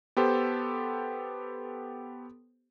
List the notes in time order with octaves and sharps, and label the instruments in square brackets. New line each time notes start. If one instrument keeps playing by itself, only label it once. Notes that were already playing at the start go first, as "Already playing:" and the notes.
[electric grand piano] B3 G4 A4 C5